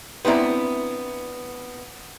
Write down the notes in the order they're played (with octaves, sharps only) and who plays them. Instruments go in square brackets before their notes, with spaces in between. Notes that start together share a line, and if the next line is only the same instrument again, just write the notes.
[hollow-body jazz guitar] B3 C4 D4 E4 A#5